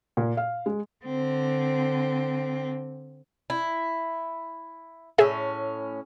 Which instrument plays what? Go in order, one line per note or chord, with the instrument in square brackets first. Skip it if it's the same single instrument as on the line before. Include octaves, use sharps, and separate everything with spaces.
[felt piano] A#2
F5
G#3
[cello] D3 C4
[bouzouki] E4
[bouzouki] A2 C#4 [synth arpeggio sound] G#4 E5